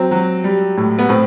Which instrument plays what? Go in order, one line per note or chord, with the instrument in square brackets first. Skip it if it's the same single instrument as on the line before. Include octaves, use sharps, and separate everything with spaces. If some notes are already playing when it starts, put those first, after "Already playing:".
Already playing: [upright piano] F#3 C4
F#3
G3
A2
B3
A2 C4